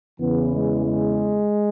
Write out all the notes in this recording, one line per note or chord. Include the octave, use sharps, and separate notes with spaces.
E2 C#3 E3 B3
G#3
G#3